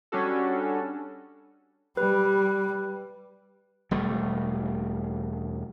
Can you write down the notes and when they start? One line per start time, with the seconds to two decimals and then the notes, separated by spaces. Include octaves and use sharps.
0.12 G3 C#4 D4 F#4 A4
1.97 G3 B4
3.91 E1 G3 A3